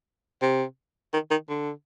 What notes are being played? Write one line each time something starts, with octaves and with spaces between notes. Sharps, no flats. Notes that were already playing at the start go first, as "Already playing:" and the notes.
C3
D#3
D#3
D3